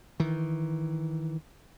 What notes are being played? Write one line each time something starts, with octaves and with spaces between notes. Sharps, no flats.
D#3 E3